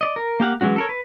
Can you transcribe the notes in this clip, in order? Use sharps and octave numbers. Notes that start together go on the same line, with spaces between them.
D5 D#5
A#4
A#3 G4 F5 F#5
E3 F#3 G#3 C#4 F#4
A4 A#4 C#5
B4